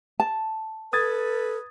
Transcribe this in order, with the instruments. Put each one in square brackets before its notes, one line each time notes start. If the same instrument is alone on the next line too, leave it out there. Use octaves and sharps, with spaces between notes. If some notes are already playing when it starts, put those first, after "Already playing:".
[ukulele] A5
[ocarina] A4 [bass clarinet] B4 [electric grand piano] D#6 G#6 A6